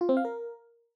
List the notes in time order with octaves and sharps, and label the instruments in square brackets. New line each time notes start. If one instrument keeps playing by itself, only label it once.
[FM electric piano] F4
C4
F5
A#4